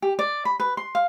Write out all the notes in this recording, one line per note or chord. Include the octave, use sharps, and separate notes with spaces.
G4
D5
B5
B4
C6
F5